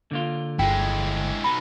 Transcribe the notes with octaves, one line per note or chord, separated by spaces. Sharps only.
D3 A#3 F4
G1 G#3 E4 G5
B2 D#4 B5